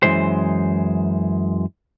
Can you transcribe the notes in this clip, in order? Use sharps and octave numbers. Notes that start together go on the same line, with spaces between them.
F#2 B2 E3 G#3 C5